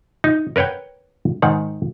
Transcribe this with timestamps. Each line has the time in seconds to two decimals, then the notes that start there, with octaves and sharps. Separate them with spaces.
0.24 D#4
0.56 A#4 B4 C#5 F#5 G5
1.42 G#2 D#3 F#5